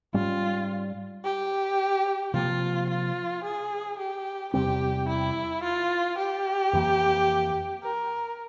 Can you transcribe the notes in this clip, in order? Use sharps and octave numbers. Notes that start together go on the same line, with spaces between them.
G#2 G3 C#4 F4
G4
C3 F3 A#3 F4
F4
G#4
G4
E2 C3 G3 C4 G4
E4
F4
G4
F2 E3 A#3
A#4